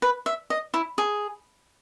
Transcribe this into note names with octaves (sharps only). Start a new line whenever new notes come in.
B4
E5
D#5
E4
G#4